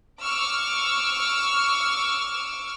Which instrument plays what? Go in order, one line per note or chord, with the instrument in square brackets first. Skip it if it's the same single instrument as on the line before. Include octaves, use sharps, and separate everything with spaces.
[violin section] C#6 D6 E6 F6